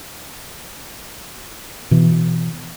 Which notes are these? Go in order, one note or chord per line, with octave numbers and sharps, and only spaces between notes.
B2 E3